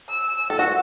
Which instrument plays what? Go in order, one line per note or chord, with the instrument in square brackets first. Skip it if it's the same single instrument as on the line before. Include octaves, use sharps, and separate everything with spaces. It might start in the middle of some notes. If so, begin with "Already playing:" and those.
[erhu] E6
[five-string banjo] A4
F#4